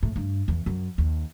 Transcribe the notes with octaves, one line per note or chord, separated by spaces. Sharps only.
A2
G2
E2
F#2
D#2